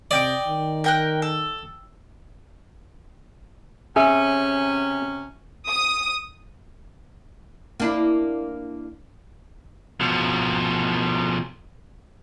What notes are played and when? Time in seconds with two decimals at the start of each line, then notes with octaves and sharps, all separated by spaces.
0.11 C3 D5 D#5 G5 D6
0.47 D#3
0.84 A#4 G5 F#6
1.22 A4
3.96 C3 C#4 G#4 E5
5.69 D#6
7.80 A#3 D4 E4
10.01 B2 F3